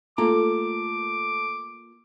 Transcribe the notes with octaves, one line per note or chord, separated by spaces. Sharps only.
A3 A#3 F4 A#5 D6